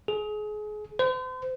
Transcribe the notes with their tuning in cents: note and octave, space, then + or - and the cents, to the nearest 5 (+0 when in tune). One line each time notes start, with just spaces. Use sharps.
G#4 +30
C5 -40